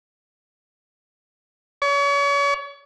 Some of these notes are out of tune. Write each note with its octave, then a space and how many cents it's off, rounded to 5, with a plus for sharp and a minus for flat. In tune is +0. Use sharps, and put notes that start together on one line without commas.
C#5 +35